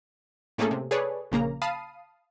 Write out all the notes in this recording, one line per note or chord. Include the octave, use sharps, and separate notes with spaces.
A2 A3 A#3 C#4 G#4 A4
C3
G#4 A4 B4 C#5 D5
A#1 C#3 A#3 A#5
F5 A5 B5 D#6 C7 D#7